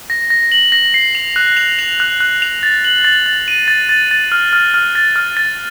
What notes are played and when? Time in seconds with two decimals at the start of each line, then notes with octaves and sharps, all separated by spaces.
0.10 A#6
0.30 A#6
0.52 F#7
0.72 A#6
0.94 C7
1.15 F7
1.36 F#6
1.57 F7
1.79 F7
2.00 F#6
2.21 F#6
2.42 F7
2.63 A6
2.84 F#7
3.05 A6
3.26 A6
3.48 D#7
3.68 A6
3.89 A6
4.11 A6
4.32 F6
4.53 F6
4.74 F6
4.95 A6
5.16 F6
5.37 A6